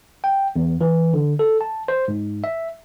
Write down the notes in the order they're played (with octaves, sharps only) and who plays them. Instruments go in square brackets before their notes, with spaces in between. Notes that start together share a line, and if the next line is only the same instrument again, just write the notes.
[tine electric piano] G5
E2
E3
D3
A4
A5
C5
G#2
E5